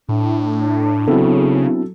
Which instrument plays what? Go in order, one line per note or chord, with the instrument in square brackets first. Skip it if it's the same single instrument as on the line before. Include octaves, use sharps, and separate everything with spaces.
[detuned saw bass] A2 [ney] D4
[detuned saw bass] C#3 [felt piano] F#3 A4 [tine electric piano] B3 C4 E4